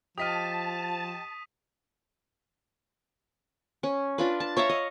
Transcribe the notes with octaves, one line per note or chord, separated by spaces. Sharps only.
F3 G4 D#5 A5 D#6 F6 B6 D#7
C#4
D4 F4 B4
A5
C#5 E5 F5 A#5
D#5